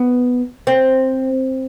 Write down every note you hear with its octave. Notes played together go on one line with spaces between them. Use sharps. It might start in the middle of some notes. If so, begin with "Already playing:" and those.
Already playing: B3
C4